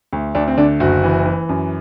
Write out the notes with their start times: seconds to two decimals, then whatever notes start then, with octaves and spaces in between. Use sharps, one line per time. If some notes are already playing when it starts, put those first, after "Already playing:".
0.13 D2
0.35 D2 D4
0.48 C4
0.58 D3 D4
0.80 F#1 F#4
1.04 E3
1.26 E3
1.49 F#2